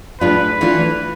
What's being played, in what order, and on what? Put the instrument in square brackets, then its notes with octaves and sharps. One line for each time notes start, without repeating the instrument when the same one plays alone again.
[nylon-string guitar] A2 G#3 D4 F4 [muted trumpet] B4
[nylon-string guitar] E3 A3 D4 F4